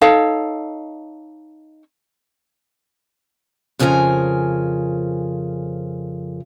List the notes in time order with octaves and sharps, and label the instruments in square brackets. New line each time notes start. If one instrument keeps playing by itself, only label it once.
[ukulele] D#4 A4 C#5 F5
[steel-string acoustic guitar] F2 C#3 F3 F#4 A#4 G#5